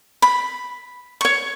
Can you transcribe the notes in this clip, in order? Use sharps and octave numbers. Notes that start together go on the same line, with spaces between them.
B5
C#5 C#6